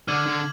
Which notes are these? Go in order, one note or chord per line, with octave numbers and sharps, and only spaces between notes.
D3 D6 F6 G#6 D#7 F#7
D3